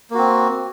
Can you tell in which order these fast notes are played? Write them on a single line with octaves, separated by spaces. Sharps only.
A#3 F#4 C4